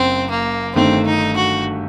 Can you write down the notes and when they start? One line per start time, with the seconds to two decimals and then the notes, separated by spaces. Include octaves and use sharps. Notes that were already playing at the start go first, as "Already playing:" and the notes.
Already playing: F#1 F#2 C4
0.30 A#3
0.75 G1 G2 D#3 A3 C4
1.07 D#4
1.36 F#4